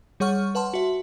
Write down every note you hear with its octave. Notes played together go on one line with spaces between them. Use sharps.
G3 G#4 C#5 F#5 C#6 F6
B4 F#5 A5 C6
F#4 E5